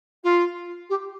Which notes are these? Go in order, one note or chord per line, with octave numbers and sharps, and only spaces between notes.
F4
G4